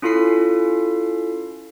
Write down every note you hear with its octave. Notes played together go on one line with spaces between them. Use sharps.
C#4 E4 F4 A4 B6 C7